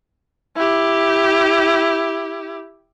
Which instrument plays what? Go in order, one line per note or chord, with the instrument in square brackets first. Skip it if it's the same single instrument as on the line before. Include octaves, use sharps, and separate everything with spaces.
[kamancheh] E4 G4